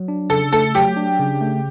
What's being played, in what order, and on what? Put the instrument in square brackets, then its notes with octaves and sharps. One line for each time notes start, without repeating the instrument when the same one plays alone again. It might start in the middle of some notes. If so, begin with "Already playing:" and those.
Already playing: [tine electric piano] F#3
D4
[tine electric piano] C#3 [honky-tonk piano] A4
[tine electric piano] A3 [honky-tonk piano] A4
[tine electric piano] F#3 [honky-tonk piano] G4
[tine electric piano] D4
C#3
A3